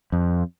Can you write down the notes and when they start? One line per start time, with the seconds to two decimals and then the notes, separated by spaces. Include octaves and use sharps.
0.12 F2